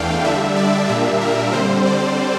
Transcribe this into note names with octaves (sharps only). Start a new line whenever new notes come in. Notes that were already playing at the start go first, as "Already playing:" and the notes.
Already playing: E2 E3 A3 D4 F5 G5
D3 G3 D4 E5
D5
A#2 G3 A#3 D4 E5
A#4
D3 G3 C4 C5
D5